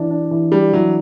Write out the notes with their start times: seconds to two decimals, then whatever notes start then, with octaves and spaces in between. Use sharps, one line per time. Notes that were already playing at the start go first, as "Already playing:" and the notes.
Already playing: E3 D4
0.10 D4
0.31 E3
0.52 G3 D4
0.73 E3 F#3